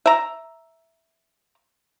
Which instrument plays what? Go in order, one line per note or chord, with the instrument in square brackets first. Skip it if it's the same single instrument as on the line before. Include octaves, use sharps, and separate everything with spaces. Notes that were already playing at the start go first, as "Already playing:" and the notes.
[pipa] E5 A#5